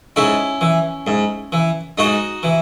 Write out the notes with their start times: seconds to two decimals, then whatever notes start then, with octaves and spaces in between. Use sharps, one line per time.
0.16 G#2 C#4 E4
0.61 E3
1.07 G#2
1.52 E3
1.98 G#2 D#4 F#4
2.43 E3